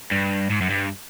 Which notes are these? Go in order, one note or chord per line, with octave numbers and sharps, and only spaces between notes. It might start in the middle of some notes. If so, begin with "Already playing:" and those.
G2
G#2
F#2
G2